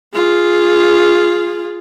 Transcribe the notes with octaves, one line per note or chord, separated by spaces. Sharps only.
F4 G#4